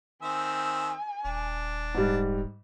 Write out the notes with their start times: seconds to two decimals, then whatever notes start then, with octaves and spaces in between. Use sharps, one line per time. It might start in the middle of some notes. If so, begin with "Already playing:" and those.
0.22 D#3 C4 E5 G#5
1.25 D#1 D4
1.95 G#2 G3